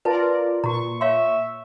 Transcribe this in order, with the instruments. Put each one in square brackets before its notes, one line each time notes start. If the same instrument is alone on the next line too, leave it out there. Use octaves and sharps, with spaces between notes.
[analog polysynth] F4 A#4 D5 [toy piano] B4 A5
[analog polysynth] A#2 C#6 [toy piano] F#4 A#5
[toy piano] C#5 F5 C6 [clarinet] E5